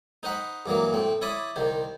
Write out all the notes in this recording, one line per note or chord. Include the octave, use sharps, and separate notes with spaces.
D#4 C5 D#5 F#5 B5
G2 E3 F#3 A#3
A2 C4
E4 C#5 D5 B5 D#6
C2 D#3 C5